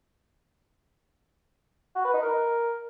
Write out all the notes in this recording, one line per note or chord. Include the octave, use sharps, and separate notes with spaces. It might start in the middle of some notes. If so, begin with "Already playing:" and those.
F#4
B4
D#4
A#4